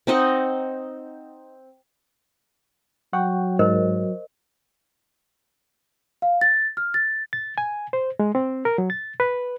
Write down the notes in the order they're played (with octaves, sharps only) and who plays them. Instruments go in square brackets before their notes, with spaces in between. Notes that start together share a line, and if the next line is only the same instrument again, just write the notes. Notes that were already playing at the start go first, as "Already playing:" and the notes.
[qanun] C4 D#4 D#5 F#5
[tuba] F#3 [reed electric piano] F#5 G5 [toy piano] C#6
[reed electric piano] G#2 [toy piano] A#4 C5 D#5
[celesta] F5
A6
F6
A6
[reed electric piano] A6
G#5
C5
G#3
C4
A#4
F#3
A6
B4